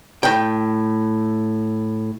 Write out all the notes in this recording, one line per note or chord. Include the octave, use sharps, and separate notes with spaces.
A2 G5